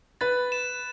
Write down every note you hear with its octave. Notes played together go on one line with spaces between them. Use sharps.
B4 A6
E7